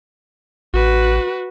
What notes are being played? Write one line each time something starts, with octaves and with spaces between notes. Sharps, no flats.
A1 F#4 B4